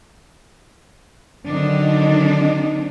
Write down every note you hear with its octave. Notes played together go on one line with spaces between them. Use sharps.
D3 D#3 F#3 C4 D4 D#4